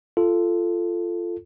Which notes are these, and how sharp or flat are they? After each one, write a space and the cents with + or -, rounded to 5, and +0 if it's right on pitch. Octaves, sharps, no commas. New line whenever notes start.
F4 -15 A4 +0